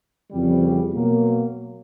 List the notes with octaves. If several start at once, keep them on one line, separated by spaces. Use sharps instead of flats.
F2 C#3 E3 G3
B2 F#3 A#3